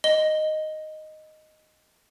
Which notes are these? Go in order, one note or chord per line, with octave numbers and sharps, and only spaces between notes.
D#5 G7